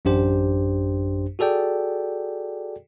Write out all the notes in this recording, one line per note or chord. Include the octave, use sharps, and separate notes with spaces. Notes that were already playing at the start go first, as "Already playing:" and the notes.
A1 F#2 D4 G4 C5
F#4 G#4 A4 D5 G5